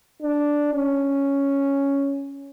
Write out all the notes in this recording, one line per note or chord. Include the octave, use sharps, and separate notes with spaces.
D4
C#4